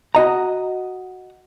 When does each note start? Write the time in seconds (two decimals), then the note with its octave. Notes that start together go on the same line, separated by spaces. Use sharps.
0.15 F#4 D#5 A#5